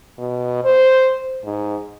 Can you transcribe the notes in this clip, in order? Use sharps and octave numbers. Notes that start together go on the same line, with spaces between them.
B2
C5
G#2